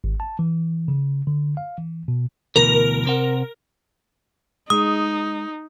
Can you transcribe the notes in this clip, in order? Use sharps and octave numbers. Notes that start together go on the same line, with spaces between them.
G#1
A5
E3
C#3
D3
F5
E3
B2
D2 B2 E3 A#4
C3 C4 F#5
G#3 D#4 D#6